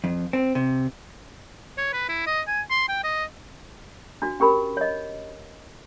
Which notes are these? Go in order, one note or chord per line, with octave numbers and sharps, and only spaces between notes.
F2
C4
C3
C#5
B4
E4
D#5
G#5
C6
G5
D#5
D4 F#4
C#4 G4 A#4 B5
C#5 D#5